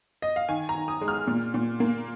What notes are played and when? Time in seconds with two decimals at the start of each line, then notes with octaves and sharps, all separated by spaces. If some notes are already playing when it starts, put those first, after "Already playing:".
0.22 D#5
0.36 F5
0.49 D#3 G#5
0.69 A#5
0.75 D#3
0.88 D#6
1.01 G#3
1.08 F6
1.27 A#2
1.54 A#2
1.80 A#3